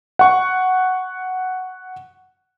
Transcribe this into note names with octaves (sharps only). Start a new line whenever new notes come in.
F#5 C#6